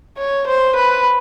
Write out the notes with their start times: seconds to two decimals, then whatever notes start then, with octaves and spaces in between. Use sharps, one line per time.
0.18 C#5
0.47 C5
0.75 B4